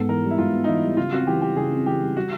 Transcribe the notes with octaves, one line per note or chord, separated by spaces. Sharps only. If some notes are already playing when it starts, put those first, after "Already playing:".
Already playing: G#2 B3 A4
E3 A#4
G3
E4
G#2 F4
B3
D#4
E3 E4
G3
C#3 F4
C4 F#4
E3 G4
G3 G4
C#3 G#4
C4
E3 G4
G3
G3 F#4